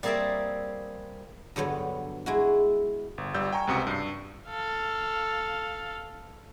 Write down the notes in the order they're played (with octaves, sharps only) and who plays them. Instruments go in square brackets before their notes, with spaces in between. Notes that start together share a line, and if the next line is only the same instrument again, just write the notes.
[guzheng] G3 A#3 C4 G#4 D5 E5
G2 D3 F#3 B3
G#3 E4 F#4
[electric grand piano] G1
G1 G3 E6 G6
G5 G#5 A#5 C#6
C#2 F#2 C3 F#4 D#6 C#7
G2 C7
[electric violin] A4 F5